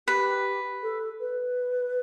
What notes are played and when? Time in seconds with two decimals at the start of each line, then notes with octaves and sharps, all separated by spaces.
0.07 G4 B4
0.83 A4
1.20 B4